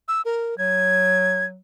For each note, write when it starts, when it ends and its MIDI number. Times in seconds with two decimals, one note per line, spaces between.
0.08 0.22 88
0.25 0.57 70
0.58 1.60 54
0.58 1.45 92